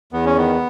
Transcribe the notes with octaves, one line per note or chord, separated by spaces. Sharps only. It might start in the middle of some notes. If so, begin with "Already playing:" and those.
E2 B3
C#4
D#3 B3